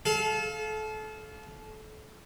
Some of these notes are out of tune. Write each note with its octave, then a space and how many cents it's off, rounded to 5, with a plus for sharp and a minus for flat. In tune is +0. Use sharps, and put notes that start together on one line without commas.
A4 -30 F5 +0